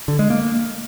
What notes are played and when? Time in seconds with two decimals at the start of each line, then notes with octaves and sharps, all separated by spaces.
0.08 D3
0.19 G#3
0.30 A#3